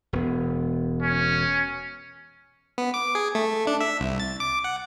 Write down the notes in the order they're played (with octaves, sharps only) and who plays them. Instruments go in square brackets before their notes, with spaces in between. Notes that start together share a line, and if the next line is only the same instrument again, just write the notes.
[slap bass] E1 B3
[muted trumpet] C#4
[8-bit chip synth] B3
D6
G#4
A3
D4
E5
C2
A6
D6
F#5